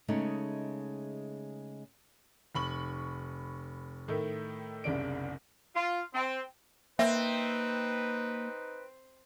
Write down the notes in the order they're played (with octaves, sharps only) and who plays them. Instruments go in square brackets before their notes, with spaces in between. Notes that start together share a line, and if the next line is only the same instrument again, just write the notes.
[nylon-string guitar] C#3 G#3 A3 D#4
[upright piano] F1 B5 C#6 F#7
A2 D#3 A3
F#1 C2 C#3 D4 D7
[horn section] F4
C4
[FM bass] A#3 [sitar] C4 [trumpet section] D#4 B4 [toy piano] E5